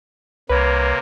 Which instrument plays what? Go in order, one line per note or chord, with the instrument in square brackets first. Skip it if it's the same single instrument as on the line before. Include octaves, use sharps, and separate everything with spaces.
[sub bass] C2 [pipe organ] C3 A#3 [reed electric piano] B4 [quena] C#5